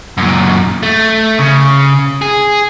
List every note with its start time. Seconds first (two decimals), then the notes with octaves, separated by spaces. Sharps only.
0.18 F#2 A#2
0.83 A3
1.39 C#3
2.22 G#4